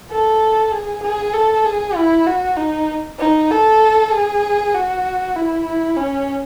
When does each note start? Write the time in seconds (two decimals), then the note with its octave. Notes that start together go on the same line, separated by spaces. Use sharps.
0.11 A4
0.72 G#4
1.03 G#4
1.33 A4
1.65 G#4
1.96 E4
2.27 F#4
2.57 D#4
3.19 D#4
3.51 A4
4.12 G#4
4.74 F#4
5.36 E4
5.67 E4
5.97 C#4